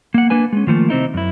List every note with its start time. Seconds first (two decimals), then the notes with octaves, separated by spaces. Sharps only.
0.14 A#3 F#5
0.30 A#3 D4 B4 G#5
0.53 G#3 C#4
0.67 D#3 F3 A3 A#3
0.89 C3 C4 D#4 E4
1.14 F#2 E4